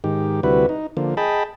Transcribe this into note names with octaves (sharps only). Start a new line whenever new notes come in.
G#2 D#3 G4
D2 C3 G3 E4 F#4 B4
D#4
D3 F3 A#3
G#4 D#5 G5 A5 B5